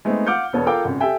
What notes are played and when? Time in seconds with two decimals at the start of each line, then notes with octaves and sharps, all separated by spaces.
0.05 G#3 A3 B3 C4 D#4
0.26 F5 F#5 D6 F6 G6 C#7
0.53 E1 B3 C#5 A5
0.66 F4 A4 A#4 F5 G5 D6
0.84 G#1 C#3
1.00 G4 A4 E5 G5 G#5